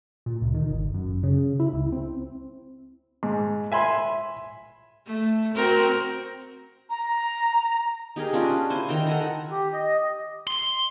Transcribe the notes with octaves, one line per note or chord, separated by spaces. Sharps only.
A#2
C#2
D#3
G1
F#2
C#3
E4
C#2
C4
G#2
E5 G#5 B5 C6
A3
C4 F#4 A#4
A#5
D#4 G4 G#4 A#4
C#4 D4 F4 D5
E4 C5 G#5
D#3 G5 A#5
A4 F#5 G#5 A#5
G4
D#5
C6